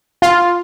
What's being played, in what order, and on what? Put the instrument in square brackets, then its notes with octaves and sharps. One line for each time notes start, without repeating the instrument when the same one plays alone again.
[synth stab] F4